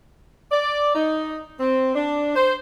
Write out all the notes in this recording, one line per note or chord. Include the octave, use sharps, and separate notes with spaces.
D5
D#4
C4
D4
C5